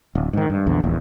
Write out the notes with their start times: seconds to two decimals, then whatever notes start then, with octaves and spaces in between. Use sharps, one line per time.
0.15 D1
0.33 G#2 D#3
0.50 G2
0.66 A#1 E2 D3
0.83 D#1 A#1 E2